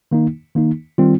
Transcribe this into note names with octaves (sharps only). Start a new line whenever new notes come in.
D#3 A#3 D#4
D#3 A#3 D#4
D#3 G3 C4 F4